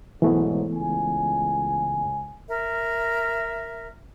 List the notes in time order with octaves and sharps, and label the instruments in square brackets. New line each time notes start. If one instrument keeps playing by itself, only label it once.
[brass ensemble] B1 G#2 [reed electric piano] E3 A3 B3
[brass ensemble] C#2 G#5
[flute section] A#4 E5